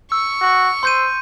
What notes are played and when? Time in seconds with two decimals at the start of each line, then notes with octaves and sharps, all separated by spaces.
0.12 C#6 E6
0.41 F#4
0.83 C5 C6 G6 D#7